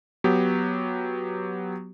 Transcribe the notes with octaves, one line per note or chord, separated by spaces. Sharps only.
F#3 B3 G4